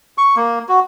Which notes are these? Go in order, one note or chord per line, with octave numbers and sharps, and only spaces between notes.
C#6
A#3
F#4